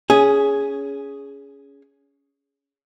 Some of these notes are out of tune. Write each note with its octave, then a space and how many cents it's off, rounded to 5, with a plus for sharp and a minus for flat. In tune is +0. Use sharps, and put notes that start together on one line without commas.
C#4 +20 G#4 +0